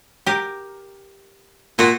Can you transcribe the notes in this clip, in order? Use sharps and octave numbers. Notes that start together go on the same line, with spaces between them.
G4 A#4
A#2 F4 F#4